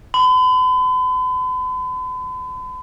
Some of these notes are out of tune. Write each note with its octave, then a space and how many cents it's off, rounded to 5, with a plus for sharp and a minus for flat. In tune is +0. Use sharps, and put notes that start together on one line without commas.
B5 +45